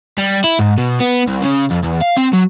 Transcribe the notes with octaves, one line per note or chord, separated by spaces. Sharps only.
G3
E4
G#2
B2
B3
C2
C#3
F2
E2
F5
C4
F#3